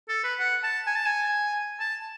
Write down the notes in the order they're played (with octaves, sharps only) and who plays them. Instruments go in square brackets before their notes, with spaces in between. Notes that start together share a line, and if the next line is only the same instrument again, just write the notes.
[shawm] A4
B4
F#5
A5
G#5
A5
G#5
A5